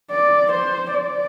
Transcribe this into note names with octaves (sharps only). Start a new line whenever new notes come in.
D5
C5
D5